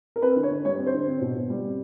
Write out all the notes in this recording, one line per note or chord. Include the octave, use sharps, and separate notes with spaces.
A#4
C4 B4
D3
C#5
D3
G3 C#5
C4
C5
D3
C4
B2
B2
G3
C4